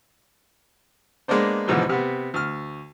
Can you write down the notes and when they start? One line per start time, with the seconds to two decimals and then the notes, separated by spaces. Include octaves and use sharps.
1.28 G#3 A#3 B3 D4 C5
1.68 D#2 G#2 B2 D3 E3 F3
1.89 C3 B3
2.34 D2 F6